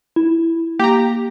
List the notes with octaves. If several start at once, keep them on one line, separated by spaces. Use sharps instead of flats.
E4
A#3 G4 A#5